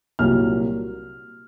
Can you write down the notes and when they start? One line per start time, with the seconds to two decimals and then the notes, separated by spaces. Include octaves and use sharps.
0.19 C2 A#2 F#3 A#3 F6